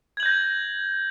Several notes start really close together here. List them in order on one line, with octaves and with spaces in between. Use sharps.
G#6 F#7 G6 A#6